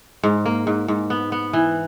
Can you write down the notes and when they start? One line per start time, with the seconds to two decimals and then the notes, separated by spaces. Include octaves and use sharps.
0.23 G#2
0.46 A#3
0.67 G#2
0.88 G#2
1.10 B3
1.32 B3
1.53 E3